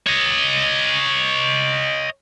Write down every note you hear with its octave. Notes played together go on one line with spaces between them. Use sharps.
C#5 D#5